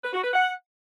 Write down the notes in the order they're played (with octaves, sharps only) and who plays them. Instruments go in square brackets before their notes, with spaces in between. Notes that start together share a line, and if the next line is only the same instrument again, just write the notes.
[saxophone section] B4
F#4
B4
F#5